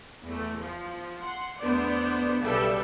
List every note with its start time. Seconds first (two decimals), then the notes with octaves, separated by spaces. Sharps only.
0.24 E2 A3
0.59 F3
1.21 F#5 C6
1.59 E2 A3 B3 D4 C5 D5
2.40 B1 C#3 G3 A4 B4 E5